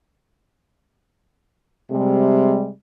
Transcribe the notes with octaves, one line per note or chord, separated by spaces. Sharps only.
C3 G3 G#3